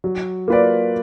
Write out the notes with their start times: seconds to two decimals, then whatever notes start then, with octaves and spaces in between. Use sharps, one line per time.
0.04 F#3
0.48 A#3 F4 B4 D5